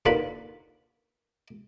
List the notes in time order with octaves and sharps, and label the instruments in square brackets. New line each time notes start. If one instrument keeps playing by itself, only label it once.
[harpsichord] D#2 D3 A#3 F4 B4 B5